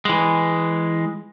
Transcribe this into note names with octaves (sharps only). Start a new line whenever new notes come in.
E3 G#3